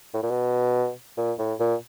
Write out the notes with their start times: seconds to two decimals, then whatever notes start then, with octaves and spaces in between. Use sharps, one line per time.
0.14 A2
0.23 A#2
0.31 B2
1.18 A#2
1.39 A2
1.60 A#2